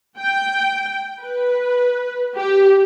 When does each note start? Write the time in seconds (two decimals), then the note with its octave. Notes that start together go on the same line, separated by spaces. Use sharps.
0.19 G5
1.20 B4
2.36 G4